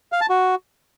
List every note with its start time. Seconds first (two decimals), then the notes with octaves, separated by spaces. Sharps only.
0.12 F5
0.21 A5
0.30 F#4